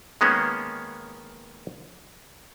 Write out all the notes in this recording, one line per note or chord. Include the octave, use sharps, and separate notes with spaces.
D#3 G#3 A#3 B3 C#4